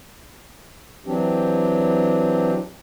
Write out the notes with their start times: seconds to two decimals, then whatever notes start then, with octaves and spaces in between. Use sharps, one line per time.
1.06 E3 F#3 C4 D4 G4